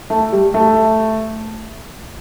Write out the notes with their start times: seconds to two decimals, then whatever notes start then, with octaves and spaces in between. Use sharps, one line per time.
0.10 A3
0.32 G3
0.54 A3